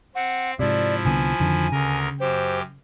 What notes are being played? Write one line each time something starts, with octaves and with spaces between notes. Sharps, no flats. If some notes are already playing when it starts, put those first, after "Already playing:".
C4 F#5
G#2 C3 F3 E4 D5
C2 D3 B3 G#5
F2 D3 D#3
D2 C#3 A#4
F#2 G4 C5